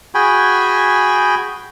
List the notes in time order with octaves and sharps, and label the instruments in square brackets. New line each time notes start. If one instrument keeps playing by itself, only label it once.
[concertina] F#4 G#4 G5 G#5 B5